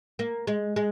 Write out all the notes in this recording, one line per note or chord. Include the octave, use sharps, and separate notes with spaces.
A#3
G#3
G#3